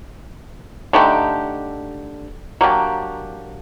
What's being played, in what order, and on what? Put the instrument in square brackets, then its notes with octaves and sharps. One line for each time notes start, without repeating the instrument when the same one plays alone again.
[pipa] D3 A3 D#4 G4
F#3 A#3 D4 G4